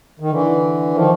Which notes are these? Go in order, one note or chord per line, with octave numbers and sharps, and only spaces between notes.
D#3
D3 E3
D#3 F3